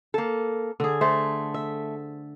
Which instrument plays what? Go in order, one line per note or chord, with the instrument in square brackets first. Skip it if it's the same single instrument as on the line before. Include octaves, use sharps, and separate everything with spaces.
[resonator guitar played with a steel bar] A#3 A4
[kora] D3 G#4
[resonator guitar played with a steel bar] A3 [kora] C5
[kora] E5